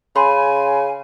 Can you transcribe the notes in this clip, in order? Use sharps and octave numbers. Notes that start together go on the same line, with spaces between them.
C#3 G#5 B5 C6